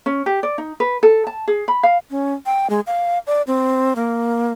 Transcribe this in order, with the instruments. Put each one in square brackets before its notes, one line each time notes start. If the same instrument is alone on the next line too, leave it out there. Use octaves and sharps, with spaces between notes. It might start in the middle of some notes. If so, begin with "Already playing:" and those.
[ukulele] C#4
G4
D5
D#4
B4
A4
A5
G#4
B5
F5
[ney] C#4
G5
G#3
F5
D5
C4
A#3